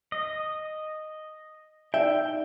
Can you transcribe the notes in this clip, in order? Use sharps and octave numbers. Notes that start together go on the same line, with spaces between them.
D#5
D#4 D5 E5 G5